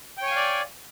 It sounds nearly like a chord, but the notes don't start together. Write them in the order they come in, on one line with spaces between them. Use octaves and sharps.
G5 C#5 G#5 F5 D5